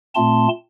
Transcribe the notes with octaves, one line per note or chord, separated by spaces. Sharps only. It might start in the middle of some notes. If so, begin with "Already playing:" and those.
A#2 A3 C4 A5 C6